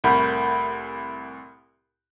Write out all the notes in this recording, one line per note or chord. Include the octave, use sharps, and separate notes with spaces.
C2 A2 A#4 F#5 B5 G6